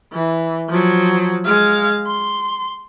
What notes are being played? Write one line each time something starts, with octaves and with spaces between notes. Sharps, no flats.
E3
F3 F#3
G#3 F5
C6